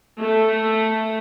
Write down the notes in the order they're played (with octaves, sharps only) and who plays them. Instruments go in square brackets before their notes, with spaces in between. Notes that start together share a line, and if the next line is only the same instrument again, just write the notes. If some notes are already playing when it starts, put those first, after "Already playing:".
[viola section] A3